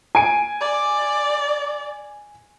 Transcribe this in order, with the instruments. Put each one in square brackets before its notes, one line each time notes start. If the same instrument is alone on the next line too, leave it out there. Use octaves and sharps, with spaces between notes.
[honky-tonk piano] G#5 D7
[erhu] D5